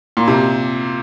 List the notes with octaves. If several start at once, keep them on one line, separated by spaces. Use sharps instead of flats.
A#2
C3